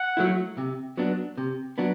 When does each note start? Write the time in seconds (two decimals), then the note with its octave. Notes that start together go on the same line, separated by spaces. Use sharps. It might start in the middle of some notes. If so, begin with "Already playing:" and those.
Already playing: F#5
0.17 F#3 A3 E4
0.58 C3
0.97 F#3 B3 D4
1.37 C3
1.78 F#3 B3 D4